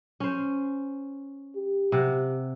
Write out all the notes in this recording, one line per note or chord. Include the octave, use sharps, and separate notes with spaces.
C#4 C5
G4
C3 F#5